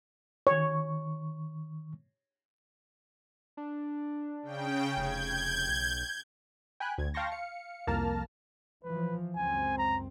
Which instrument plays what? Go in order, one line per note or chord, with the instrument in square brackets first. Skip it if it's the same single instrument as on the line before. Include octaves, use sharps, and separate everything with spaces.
[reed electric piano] D#3 C#6 [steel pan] C#5
[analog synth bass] D4
[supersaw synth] C#3 G5
[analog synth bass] F1 [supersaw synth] G6 G#6
[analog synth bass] B1
[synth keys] G5 G#5 B5 F#6
D2 G#6
F5 G5 A5 C6 C#6 A#6
F5 C#7
C2 F2 A#3 A5 A#5 F6
[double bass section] E3 F3 [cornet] B4
[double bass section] C#2 F#2 C4 [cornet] G#5
[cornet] A#5